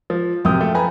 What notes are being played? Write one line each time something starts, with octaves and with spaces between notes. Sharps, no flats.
F3
F#2 C3 F3 G5 D#6
A3
B4 G#5 A#5